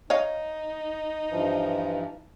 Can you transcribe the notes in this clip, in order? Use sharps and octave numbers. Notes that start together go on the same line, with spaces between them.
D#4 C#5 D#5 F5
G2 E3 F3